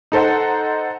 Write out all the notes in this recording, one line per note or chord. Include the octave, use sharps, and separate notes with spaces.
D#4 A4 C5 F#5